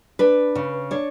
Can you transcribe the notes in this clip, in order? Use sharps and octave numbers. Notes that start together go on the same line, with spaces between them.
D4 B4
C#3
D4 C#5